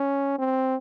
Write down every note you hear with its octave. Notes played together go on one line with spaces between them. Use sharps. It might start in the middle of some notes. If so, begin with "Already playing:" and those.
Already playing: C#4
C4